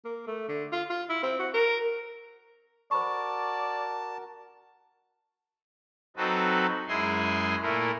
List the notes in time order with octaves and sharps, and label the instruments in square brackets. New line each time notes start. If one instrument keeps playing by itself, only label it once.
[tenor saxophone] A#3
A3
D3
F4
F4
E4
C4
F#4
A#4
[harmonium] F#4 A#4 [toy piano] C5 B5 C#6 [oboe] D5 [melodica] A5
[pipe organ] F#3 C4 D#4 F#4 A4 B4
F#2 G#3 E4 G#4 G#5 C6
A#2 A3 E4 A#4